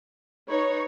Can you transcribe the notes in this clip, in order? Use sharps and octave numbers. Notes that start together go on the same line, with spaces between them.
D#4 B4 C#5